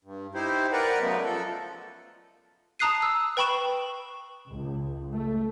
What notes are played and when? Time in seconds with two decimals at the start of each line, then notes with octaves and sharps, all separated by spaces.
0.04 G2
0.35 D#4 E4 G4 C5
0.73 A#4 B4 D5 F#5 A#5
1.01 C#3 F#3 G#3 A3 B3
1.24 F3 A4
2.79 A5 A#5 D#6 F#6 C7 D#7
3.02 E6
3.37 B4 G5 B5 C#6 E7
4.48 C#2
5.12 A3